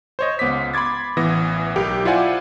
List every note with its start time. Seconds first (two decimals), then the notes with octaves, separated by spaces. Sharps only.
0.19 C5 C#5 D#5
0.39 C#2 B3 D6 B6
0.74 B5 C6 D6 G#6 A6
1.17 A1 E3 B3 D#6 A#6
1.76 B1 G4 A#4
2.05 E4 F4 C5 D5 F#5 G#5